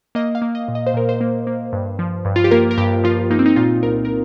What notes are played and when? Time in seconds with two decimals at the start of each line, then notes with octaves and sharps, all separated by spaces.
0.15 A#3 D#5
0.35 F5
0.42 A#3
0.55 D#5
0.68 A#2
0.75 D#5
0.87 C5
0.94 A#2 A#4
1.09 C5
1.21 A#3
1.47 A#3
1.73 G2
1.99 F3
2.25 G2
2.36 F4
2.44 G4
2.51 A#3 A#4
2.71 A#4
2.78 G2 G4
3.04 F3 F4
3.31 A#3 D#4
3.39 C4
3.46 D#4
3.56 A#2 F4
3.83 C2 A#4
4.05 A#4